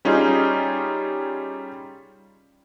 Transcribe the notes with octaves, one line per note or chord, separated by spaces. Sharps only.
G3 C#4 D#4 F4 G#4